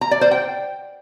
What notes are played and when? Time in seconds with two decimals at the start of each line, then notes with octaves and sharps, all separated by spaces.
0.01 A#5
0.11 D5
0.21 C5
0.31 G5